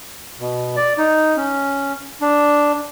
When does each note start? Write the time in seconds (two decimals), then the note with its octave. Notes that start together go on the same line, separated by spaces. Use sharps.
0.40 B2
0.77 D5
0.98 D#4
1.37 C#4
2.21 D4